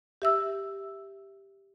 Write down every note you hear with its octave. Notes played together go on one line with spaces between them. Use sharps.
G4 E5 E6